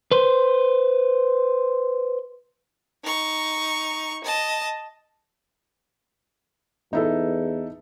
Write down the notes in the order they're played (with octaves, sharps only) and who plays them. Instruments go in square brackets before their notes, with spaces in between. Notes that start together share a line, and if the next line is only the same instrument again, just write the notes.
[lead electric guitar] B4 C5
[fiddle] D#4 C#6
D#5 A5
[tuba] E2 [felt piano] D#4 E4 A4